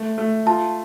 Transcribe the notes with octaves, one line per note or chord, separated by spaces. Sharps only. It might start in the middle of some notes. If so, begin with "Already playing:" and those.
Already playing: A3
A3
F4 A5